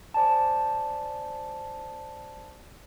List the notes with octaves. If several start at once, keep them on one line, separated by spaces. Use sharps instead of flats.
C5 D5 G#5 A5